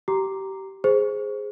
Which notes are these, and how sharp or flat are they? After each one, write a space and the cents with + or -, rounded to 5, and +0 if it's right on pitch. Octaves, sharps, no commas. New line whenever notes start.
G4 -25 A#5 +0 D6 +0
G#4 +0 C5 +0